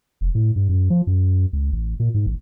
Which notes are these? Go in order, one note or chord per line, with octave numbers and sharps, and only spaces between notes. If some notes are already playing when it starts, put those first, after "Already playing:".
F1
A2
G2
F#2
F3
F#2
C#2
A1
A#2
G#2
A1